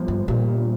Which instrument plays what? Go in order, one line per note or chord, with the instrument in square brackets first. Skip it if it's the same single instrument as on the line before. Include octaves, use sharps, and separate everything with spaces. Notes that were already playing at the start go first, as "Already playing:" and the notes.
Already playing: [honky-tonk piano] G1 F3
[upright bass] G2
[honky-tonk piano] G2 [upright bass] A#2